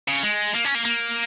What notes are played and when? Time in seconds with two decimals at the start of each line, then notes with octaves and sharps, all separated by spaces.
0.08 C#3
0.23 G#3
0.54 A#3
0.64 C#4
0.75 A#3
0.85 A#3